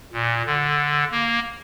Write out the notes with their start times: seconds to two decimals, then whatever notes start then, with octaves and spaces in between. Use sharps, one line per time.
0.13 A#2
0.46 D3
1.11 A#3